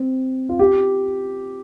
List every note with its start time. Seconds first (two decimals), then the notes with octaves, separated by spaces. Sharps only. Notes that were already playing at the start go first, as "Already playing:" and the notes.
Already playing: C4
0.49 F4
0.59 G4